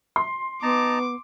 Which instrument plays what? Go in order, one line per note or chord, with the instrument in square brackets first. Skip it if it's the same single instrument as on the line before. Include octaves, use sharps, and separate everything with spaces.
[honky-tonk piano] C6
[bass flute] B3 [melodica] D#4 A5 A#5 [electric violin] D6